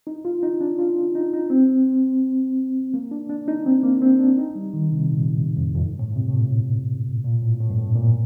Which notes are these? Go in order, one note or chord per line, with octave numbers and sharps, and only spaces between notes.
D#4
F4
D#4
D4
F4
D#4
D#4
C4
A#3
D4
D4
D#4
C4
A#3
C4
D4
D#4
G3
D#3
C3
A#2
A2
F2
F2
G2
A2
C3
A2
A#2
A#2
A2
A2
G2
A2
A#2